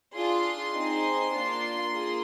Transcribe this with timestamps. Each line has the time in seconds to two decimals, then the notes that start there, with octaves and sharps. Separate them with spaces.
0.15 D4 F4 G#4 C6
0.74 C4 D#4 G#4
1.33 A#3 D4 F4
1.93 A#3 F4 G#4